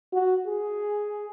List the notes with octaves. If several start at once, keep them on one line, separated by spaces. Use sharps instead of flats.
F#4
G#4